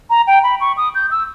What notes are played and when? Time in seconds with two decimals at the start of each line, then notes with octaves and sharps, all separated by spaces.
0.10 A#5
0.27 G5
0.43 B5
0.61 C#6
0.77 D#6
0.95 G6
1.11 E6